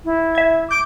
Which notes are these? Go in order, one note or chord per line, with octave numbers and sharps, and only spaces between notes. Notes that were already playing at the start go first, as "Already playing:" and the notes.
E4
E5 G#6
D6 G6